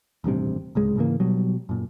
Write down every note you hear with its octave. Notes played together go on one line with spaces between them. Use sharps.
D#1 A1 G2 C3
D1 C#2 G#3
G#2 C#3 E3 A#3
B2 F#3 G3
F#2 A#2